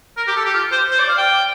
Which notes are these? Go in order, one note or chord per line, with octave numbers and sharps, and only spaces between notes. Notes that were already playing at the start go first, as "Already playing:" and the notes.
A#4
G4
A4
G4
F4
C5
C5
D5
F5
G5